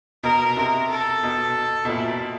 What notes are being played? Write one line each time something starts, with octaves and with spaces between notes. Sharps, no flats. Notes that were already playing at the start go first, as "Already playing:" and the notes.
B2 A#4
C3 A#4
A4
B2
B2
A#2 E4